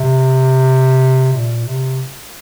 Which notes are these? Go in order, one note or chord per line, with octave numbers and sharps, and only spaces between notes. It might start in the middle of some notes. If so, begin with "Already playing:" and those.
Already playing: C3
A#2
C3